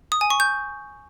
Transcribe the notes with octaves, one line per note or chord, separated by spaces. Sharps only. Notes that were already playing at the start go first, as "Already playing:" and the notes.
D#6
G#5
C#6
G6